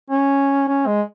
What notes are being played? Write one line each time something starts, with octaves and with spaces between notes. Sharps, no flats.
C#4
C#4
G#3